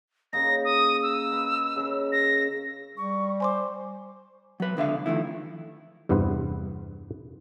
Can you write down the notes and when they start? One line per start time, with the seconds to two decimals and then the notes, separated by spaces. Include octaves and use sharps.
0.33 C#3 A#3 D#4 A#6
0.65 D#6
1.03 E6
1.32 B4
1.76 C#3 A#4
2.12 A#6
2.97 G3 C#6
3.40 C5 G#5 C6 D6
4.60 F#3 B4
4.77 C#2 D3 E5 F5
5.06 D#3 F3 A3 E4
6.09 E2 G2 C3 B3 B4 C5